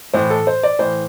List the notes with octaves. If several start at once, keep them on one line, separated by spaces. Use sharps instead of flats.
A2 E3 C5
A4
C5
D5
A2 E3 C5